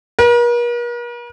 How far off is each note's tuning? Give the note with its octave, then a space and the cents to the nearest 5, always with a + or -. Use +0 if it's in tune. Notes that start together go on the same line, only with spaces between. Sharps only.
A#4 +45